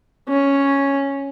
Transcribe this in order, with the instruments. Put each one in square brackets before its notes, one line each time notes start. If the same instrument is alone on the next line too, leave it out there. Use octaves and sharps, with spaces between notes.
[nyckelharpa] C#4